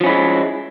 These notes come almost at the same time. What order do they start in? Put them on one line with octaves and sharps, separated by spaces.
F3 C#4 E4 G#3